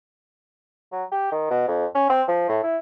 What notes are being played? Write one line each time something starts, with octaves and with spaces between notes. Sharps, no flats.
F#3
G4
D#3
B2
F2
C#4
C4
F3
A2
E4